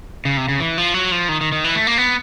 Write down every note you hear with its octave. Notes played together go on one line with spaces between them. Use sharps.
C#3
C3
C#3
E3
F3
F#3
F3
D#3
D#3
D#3
E3
A3
A#3
B3